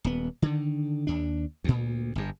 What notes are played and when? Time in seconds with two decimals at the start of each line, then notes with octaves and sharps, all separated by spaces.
0.04 D#1 B3
0.42 D3 D#3
1.07 D#2 D4
1.64 D2 A#2
2.15 G1 G2